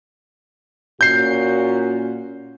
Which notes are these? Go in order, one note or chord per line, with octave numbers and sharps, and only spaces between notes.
A#2 C#4 F#4 G6 C7